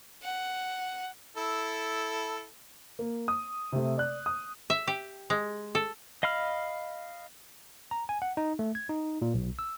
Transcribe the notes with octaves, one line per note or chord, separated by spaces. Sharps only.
F#5
E4 A4
A#3
D#6
C3 A3
D5 F#6
D#6
E5
G4
G#3
A4
D#5 F5 B5 F6
A#5
G#5
F#5
D#4
A3
G#6
D#4
A#2
B1
E6